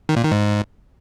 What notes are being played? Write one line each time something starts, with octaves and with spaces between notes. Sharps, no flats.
D#3
A#2
D#3
G#2